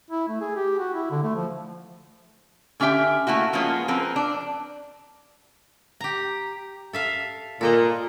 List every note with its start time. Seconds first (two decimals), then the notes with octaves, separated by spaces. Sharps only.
0.10 E4
0.28 A3
0.41 G#4
0.56 G4
0.79 F#4
0.94 E4
1.11 D3
1.23 A3
1.35 F3
2.80 D3 C#4 G4 E5 G5
3.27 A3 A#3 E4 F#4
3.53 F3 G#3 A#3 B3 C#4 F4
3.88 F3 C4 A#4 B4
4.16 D4
6.01 G4 A#5
6.93 A4 E5 F5
7.61 A#2 A4 A#4 D#5